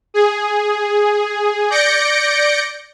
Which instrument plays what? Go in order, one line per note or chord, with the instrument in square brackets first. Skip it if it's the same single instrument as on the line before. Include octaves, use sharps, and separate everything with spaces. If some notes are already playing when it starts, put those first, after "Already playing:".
[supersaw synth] G#4
D5 G6 A#6 C#7 D7